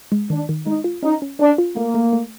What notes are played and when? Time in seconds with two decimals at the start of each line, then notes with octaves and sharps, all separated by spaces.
0.12 G#3
0.30 D#3 D4
0.49 D#3
0.66 G#3 D#4
0.84 F4
1.03 C#4 D#4
1.22 C#4
1.39 C#4 D4
1.58 F4
1.76 A3 A#3
1.94 A3
2.13 A3